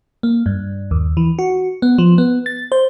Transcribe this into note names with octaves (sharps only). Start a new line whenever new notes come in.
A#3
G2
D#2
E3
F#4
B3
F3
B3
A6
C5